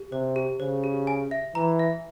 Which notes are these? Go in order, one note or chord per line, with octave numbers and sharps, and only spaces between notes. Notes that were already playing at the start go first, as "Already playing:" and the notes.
Already playing: G4
C3 C5
G4
C#3 C5
G4
G#5
E5
E3 A#5
E5